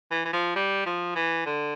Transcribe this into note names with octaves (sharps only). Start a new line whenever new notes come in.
E3
E3
F3
G3
F3
E3
D3